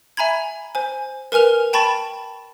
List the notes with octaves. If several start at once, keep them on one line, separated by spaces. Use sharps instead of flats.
E5 G#5 A#5 B5 G#6
C5 G#5
A#4 B4 G#5 F6 F7
G5 A5 B5 C#6 A6 E7